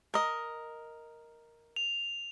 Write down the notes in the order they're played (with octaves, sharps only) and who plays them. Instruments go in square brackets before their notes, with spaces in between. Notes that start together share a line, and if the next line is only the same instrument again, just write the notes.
[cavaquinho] A#4 D#5
[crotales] F7